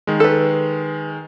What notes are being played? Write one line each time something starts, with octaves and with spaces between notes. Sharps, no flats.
D#3 G#3
A4 B4